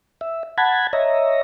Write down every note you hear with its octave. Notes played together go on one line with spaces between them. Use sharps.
E5
F#5 A5 B5 G#6
C#5 D#5 E5 A#5